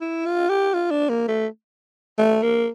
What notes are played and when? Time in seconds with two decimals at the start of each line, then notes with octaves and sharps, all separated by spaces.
0.01 E4
0.25 F4
0.49 G4
0.74 F4
0.91 D4
1.09 A#3
1.28 A3
2.18 A3
2.42 A#3